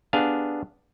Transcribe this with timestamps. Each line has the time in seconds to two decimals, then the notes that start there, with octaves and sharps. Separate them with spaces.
0.13 B3 D4 G4 G#4 F5